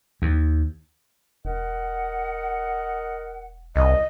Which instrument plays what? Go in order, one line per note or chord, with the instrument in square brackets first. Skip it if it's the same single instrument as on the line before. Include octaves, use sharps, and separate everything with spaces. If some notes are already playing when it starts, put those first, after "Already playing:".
[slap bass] D#2
[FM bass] E1 [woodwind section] A#4 D#5 F#5
[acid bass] C2 [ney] D#5